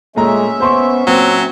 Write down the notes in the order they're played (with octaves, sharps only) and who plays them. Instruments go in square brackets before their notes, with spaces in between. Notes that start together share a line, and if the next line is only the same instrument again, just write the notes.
[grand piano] A#2 A3 A#5 [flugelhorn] G#3 [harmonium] C#4 E5
[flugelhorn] B3 [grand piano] C5 C6 C#6
[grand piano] A#2 [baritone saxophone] F#3 [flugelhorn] C4